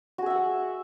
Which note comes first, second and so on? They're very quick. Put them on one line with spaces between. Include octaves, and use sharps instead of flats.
F#4 G#4 E5 F#5